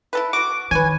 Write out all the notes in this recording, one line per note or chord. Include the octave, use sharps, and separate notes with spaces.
E4 A4 B4
B2 F#4 D6
D#3 B4 C#5 G#5